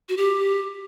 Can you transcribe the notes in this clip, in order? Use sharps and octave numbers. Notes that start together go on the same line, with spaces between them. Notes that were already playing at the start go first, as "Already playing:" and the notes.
F#4
G4